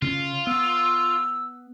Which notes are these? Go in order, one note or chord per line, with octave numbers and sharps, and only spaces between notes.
C#3 C4 C#4 F4
B3 E6